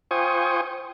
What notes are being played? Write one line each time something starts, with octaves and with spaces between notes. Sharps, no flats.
F4 C5 G5 G#5 C#6 D#6